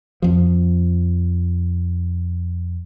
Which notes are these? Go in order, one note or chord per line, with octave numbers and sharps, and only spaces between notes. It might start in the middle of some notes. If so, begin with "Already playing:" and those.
F2 F3